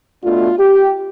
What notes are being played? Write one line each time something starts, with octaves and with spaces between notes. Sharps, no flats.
B2 A3 D4 F4
G4